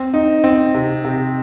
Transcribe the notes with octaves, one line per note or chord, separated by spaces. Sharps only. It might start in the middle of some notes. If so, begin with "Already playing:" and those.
Already playing: C4
D#4
C4
C3
C3